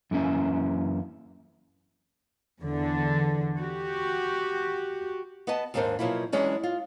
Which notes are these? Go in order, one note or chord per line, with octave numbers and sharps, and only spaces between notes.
F#2 E3 A#3 C#4 E5
E2 D3
F#4 G4
B3 B4 D#5 A5
D#2 G#2 D#3 D4 A#4 C5
B2 F3 F#3 A#3 E4
E3 F#3 G#3 C#4 D4
F4